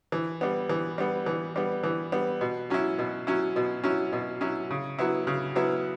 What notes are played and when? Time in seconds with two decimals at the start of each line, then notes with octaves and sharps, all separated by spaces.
0.12 E3
0.41 G3 B3
0.69 E3
0.98 G3 B3
1.26 E3
1.56 G3 B3
1.84 E3
2.12 G3 B3
2.41 B2
2.70 F#3 C#4 E4
2.99 B2
3.27 F#3 C#4 E4
3.56 B2
3.84 F#3 C#4 E4
4.12 B2
4.41 F#3 C#4 E4
4.71 C#3
4.99 F#3 B3 E4
5.27 C#3
5.55 F#3 B3 E4